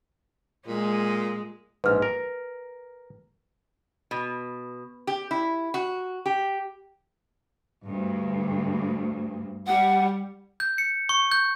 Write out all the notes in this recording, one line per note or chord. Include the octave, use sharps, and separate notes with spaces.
A#2 G#3
A#1 G#2 B4 F6
A#4
B2
G4
E4
F#4
G4
D2 G2
G3 F#5
G6
C#7
C#6
G6